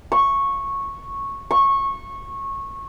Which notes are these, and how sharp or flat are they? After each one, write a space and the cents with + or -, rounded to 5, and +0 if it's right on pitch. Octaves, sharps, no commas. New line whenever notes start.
C#6 -10
C#6 -20